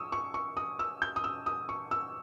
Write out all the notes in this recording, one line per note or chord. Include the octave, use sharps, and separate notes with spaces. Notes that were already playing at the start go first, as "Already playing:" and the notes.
Already playing: C#6 D#6 E6
C#6
C#6
D#6
E6
G6
D#6
E6
D#6
C#6
E6